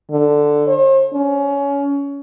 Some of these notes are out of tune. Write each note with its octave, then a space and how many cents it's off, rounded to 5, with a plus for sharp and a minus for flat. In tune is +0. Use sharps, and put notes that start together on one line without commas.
D3 +5
C5 +45
C#4 +20